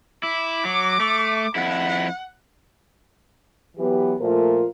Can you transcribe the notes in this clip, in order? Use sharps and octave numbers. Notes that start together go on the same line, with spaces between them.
E4 D6
F#3
A3
F2 E4 F#5
E3 F#3 B3 G4
A#2 F3 A3 F4 A#4 C5